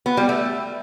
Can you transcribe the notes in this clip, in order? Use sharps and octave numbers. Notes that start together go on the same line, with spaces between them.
B3
G3
A3